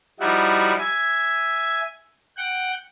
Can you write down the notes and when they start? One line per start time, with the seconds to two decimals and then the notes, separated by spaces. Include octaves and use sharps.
0.20 F3 G3 D#4 E4 F#4
0.78 E5 G#5
2.37 F#5 G5